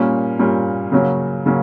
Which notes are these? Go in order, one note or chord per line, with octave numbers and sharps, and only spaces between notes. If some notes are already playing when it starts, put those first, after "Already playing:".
Already playing: A#2 G3 A#3 C#4
A#2 G3 A#3 C#4
C#3 F#3 A#3 C#4
C#3 F#3 A#3 C#4